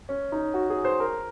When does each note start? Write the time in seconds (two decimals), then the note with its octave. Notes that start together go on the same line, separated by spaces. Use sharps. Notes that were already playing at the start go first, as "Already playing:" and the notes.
0.09 C#4
0.32 D#4
0.54 F#4
0.70 G#4
0.85 C5
1.00 A#4